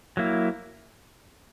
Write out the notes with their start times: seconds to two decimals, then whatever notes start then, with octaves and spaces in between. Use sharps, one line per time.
0.17 F#3 A#3 E4